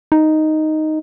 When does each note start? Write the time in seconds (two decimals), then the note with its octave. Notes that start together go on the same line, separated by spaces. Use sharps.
0.12 D#4